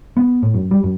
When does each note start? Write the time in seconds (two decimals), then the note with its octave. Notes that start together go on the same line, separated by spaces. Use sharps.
0.17 B3
0.43 A2
0.54 F#2
0.71 G3
0.83 F#2